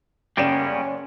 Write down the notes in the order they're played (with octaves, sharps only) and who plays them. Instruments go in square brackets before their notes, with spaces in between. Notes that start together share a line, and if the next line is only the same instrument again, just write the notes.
[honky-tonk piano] F#1 D5 E7 [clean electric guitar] G3 A#3 B3 [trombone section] C#4 [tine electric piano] G5